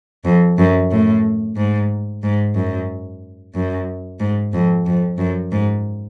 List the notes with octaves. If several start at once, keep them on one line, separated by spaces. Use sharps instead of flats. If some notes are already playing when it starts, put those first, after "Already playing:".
F2
F#2
A2
G#2
G#2
F#2
F#2
G#2
F2
F2
F#2
G#2